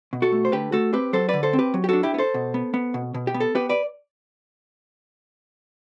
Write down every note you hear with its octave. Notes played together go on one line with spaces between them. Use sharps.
B2
F#4 A4
A3
C5
D3 G4 B4
A3 F#4 A4
C4 G4 B4
F#3 A4 C5
D3 B4 D5
A4 C5
C4
G4 B4
F#3
G4
D4 F#4 A4
E4 G4
B3
A4 C5
B2
B3
B3
B2
B2
G4
B3
A4
B3 G4 B4
B4 D5